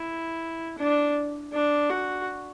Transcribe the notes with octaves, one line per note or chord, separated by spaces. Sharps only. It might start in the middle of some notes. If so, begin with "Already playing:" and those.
Already playing: E4
D4
D4
F#4